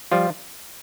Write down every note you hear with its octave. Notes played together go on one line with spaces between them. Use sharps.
F3 G3 F4